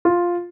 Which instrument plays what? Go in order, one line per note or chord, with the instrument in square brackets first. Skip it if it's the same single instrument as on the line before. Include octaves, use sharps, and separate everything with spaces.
[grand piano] F4